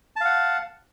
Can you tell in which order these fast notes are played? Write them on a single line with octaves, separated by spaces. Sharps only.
A5 F5 F#5